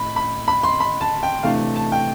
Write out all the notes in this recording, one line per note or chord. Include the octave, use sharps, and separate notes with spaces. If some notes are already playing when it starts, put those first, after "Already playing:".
Already playing: A2 B5
B5
B5
C6
B5
A5
G5
C3 E3 A3 D4 F5
A5
G5